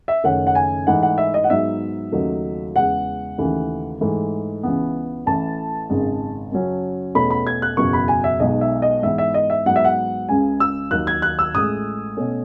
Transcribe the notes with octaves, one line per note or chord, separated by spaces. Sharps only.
E5
F#1 F#2 D#3 A3 C#4 F#5
F#5
G#5
G#2 E3 A3 D#4 F#5
F#5
E5
D#5
F#5
G#2 F#3 B3 D#4 E5
D#2 C#3 F#3 A3 D#4
E2 C#3 G#3 F#5
D#2 C#3 E3 A3
G#2 E3 A3
C#2 C#3 E3 B3
A1 A2 E3 A5
G#1 F#2 C#3 G#3
F#2 C#3 F#3 C#4
E2 B2 A3 C#4 B5
B5
G#6
F#6
F#1 E2 B2 F#3 C#6
B5
G#5
E5
B1 B2 G#3 D#4 D#5
E5
D#5
G#2 E3 B3 E5
E5
D#5
E5
G#2 F#3 B3 D#4 F#5
E5
F#5
C#2 C#3 G#3 G#5
E6
D#2 D#3 F#3 F#6
G#6
F#6
E6
A1 A2 G#3 D#6
B2 A3 C#4